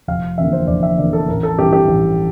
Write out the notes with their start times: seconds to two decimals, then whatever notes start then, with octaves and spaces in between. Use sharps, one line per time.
0.08 F1 F5
0.38 E2 D3 F3 A#3 E5
0.53 C5
0.67 F1 D5
0.83 E5
0.98 E2 D3 F3 A#3 D5
1.13 A4
1.28 A1 A#4
1.43 A4
1.58 G2 E3 G4
1.73 G4
1.88 A1